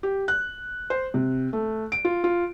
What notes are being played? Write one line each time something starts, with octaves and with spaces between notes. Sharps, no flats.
G4
F#6
C5
C3
A3
D7
F4
F4